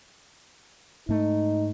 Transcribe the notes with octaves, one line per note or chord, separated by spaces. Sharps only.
G#2 A3 D#4